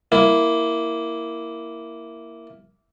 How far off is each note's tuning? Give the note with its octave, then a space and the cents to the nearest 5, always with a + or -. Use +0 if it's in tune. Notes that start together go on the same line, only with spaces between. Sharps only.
A#3 +0 E4 +0